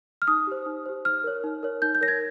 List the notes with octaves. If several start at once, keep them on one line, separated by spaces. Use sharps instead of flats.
F6
D#4 D#6
G4 C5
D#4
G4 C5
D#4 F6
A#4 C#5
D#4
A#4 C#5
D#4 G6
G6
A#4 C#5 A#6
G#6